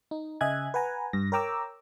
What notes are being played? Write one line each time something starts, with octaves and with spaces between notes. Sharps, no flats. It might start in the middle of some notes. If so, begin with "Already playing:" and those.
D#4
C#3 D#5 E5 G#5 F#6 G#6
B4 F#5 G#5 A#5
G2 A#6
A#4 C#5 G5 A#5 D6 E6